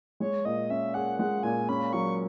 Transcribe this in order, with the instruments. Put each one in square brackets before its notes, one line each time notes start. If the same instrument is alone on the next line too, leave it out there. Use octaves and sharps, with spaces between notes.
[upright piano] G#3 [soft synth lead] C#5
[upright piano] A#2 [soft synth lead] D#5
[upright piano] C#4 [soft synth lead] E5
[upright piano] G#4 [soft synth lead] F#5
[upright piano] G#3 [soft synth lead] F#5
[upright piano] A#2 [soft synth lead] G#5
[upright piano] C#4 [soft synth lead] B5
[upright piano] F#3 [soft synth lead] C#6